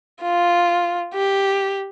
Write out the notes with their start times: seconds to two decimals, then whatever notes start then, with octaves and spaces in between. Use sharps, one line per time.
0.22 F4
1.14 G4